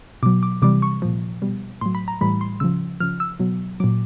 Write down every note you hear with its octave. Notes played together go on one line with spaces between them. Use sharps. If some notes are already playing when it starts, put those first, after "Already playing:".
B2 F#3 D6
D6
C3 E3 G3 D6
C#6
A#2 F3
B2 G3
A2 F#3 C6
B5
A#5
A2 E3 G3 B5
C6
C#3 F3 E6
C#3 F3 F6
E6
B2 F#3
A#2 F#3 D6